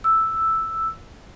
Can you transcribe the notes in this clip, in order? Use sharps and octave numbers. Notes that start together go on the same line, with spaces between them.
E6